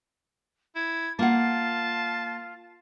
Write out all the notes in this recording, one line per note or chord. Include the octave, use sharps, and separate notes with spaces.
E4 G#6
A#3 F4 F#5 A5